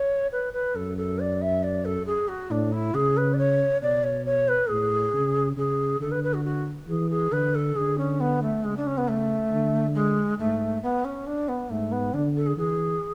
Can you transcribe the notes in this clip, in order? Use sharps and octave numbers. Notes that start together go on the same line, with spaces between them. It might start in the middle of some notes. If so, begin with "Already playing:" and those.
Already playing: C#5
B4
B4
F#2 A4
A4
D5
E5
D5
A4
G#4
F#4
A2 D4
E4
C#3 G#4
B4
D5
C#5
B2 D5
C#5
C#5
B4
A2 G#4
C#3
C#3 G#4
D3 A4
B4
B4
F#4
F#4
E3 G#4
G#4
D3 B4
A4
D3 G#4
C#4
B3
A3
C#3 G#3
D4
C#4
B3
A3
D3
G#3
G#2 A3
B3
C#4
D4
B3
G#2 A3
B3
D3 D4
A4
G#4
E3 G#4